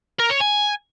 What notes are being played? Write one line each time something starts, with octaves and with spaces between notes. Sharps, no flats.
A#4
C#5
G#5